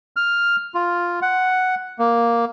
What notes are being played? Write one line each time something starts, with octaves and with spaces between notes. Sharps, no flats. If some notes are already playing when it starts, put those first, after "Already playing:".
F6
F4
F#5
A#3